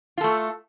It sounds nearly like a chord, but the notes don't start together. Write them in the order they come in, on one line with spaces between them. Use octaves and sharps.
F4 A4 A3